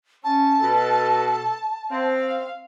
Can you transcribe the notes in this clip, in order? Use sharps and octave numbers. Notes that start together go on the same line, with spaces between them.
C#4 A5
B2 A4
C4 F5